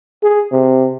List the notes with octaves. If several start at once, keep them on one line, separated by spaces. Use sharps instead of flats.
G#4
C3